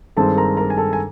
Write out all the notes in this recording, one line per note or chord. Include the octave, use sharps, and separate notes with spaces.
G2 D#3 G#3 C4 A4 A5
A#4 A#5
A#4 A#5
G#5
A4 A5
G#5